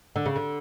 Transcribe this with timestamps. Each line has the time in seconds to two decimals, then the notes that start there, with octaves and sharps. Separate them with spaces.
0.16 D3
0.26 C#3
0.36 D3